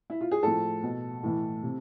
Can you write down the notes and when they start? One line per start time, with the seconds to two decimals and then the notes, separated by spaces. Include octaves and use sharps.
0.10 E4
0.21 F4
0.31 G#4
0.43 A2 F3 A4
0.83 B2
1.23 A2 E3
1.63 C3